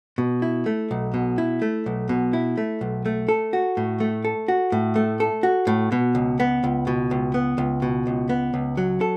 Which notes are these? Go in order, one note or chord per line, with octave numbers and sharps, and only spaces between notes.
B2
E4
A3
B1
B2
E4
A3
B1
B2
E4
A3
B1
A3
A4
F#4
A2
A3
A4
F#4
A2
A3
A4
F#4
A2
B2
C#2
B3
C#2
B2
C#2
B3
C#2
B2
C#2
B3
C#2
F#3
A4